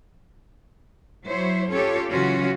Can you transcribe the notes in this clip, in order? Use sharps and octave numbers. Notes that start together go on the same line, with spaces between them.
F#3 E4 C5 C#5
C#4 F4 G4 A4 C#5
C#3 E3 F#3 C#4 F4 F#4